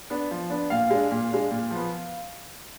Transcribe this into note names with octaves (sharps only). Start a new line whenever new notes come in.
B3 D4
F3
B3 D4
A#2 F5
G#3 D4
A#2
G#3 D4
A#2
F3 B3